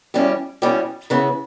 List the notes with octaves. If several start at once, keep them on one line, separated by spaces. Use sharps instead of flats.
E2 B2 G3 C#4 G4
E2 B2 G3 C#4 G4
C#3 E3 B3